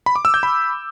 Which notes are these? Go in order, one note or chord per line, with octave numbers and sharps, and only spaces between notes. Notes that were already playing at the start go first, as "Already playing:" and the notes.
B5
D6
E6
G6
B5